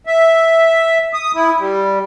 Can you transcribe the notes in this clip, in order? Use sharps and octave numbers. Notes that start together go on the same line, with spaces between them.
E5
D#6
E4
G3